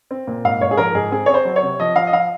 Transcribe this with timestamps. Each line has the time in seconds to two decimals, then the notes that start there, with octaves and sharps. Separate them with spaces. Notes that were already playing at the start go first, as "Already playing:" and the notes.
0.11 C4
0.27 A#2
0.45 G#2 F5
0.61 G#2 C#5
0.71 G#4
0.77 F3 A#4
0.95 G#2 G#4
1.11 C4 G#4
1.26 C4 C#5
1.34 C5
1.45 F#3
1.56 C#5
1.62 C3
1.80 F3 D#5
1.96 F3 F5
2.07 D#5
2.13 F3 F5